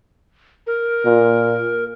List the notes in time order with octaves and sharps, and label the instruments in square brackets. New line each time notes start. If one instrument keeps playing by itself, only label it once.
[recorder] A#4
[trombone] A#2